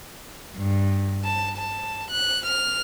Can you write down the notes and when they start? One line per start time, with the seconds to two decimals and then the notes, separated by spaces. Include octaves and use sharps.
0.55 G2
1.23 A5
1.55 A5
2.09 F#6
2.45 F6